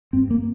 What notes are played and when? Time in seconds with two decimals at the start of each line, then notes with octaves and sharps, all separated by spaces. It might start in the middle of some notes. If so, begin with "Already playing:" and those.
0.13 G2 C4
0.30 A#3